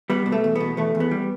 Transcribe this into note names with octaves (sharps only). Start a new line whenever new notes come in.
G3 B3
B2
A3
E2
B2 B3
E2 A3
E2
B3
G3